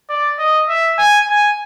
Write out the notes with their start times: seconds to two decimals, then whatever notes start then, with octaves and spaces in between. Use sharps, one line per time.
0.10 D5
0.39 D#5
0.69 E5
0.99 G#5
1.30 G#5